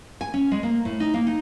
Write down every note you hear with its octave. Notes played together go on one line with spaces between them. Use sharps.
G#5
C#4
G#3
A#3
A2
D#4
A#3
D#4